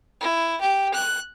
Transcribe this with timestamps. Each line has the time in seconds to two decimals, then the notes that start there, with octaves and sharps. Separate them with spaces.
0.21 E4
0.61 G4
0.94 F#6